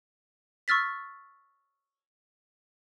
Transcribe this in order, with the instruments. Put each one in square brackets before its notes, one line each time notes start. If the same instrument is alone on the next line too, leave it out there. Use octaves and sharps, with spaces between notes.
[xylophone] C#6 E6 F6 A6 B6